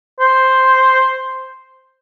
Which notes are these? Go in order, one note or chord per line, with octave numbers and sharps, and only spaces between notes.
C5